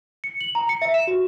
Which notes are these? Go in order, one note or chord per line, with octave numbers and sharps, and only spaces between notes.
C#7
F#7
A#5
C#7
E5
E7
F#4